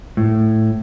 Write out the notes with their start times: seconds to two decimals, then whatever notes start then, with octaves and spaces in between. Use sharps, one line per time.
0.17 A2